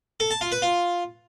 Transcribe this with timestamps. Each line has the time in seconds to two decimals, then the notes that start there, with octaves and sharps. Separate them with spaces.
0.20 A4
0.31 A5
0.41 F4
0.52 B4
0.62 F4